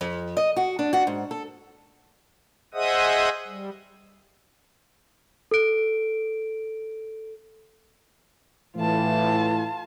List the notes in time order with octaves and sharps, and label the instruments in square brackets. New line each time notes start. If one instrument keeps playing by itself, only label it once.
[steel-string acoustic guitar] F2
D#5
F#4
D4
F#4
G#2
A4
[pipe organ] G#4 C5 D#5 E5 F#5 D#6
G3
[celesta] A4 D7
[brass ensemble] A2 E3 [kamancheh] F4 A5